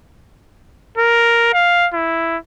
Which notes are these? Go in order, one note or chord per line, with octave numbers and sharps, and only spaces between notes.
A#4
F5
E4